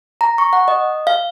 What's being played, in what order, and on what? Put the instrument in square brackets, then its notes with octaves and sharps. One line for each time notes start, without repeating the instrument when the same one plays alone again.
[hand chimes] A#5
C#6
F#5
D#5
F5